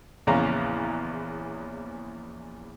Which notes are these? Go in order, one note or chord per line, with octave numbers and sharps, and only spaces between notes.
A#1 E2 C#3 C#4 F5 A#5